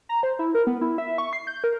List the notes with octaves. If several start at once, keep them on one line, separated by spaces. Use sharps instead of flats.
A#5
C5
E4
A#4
B3
E4
E5
C#6
C7
G6
A#4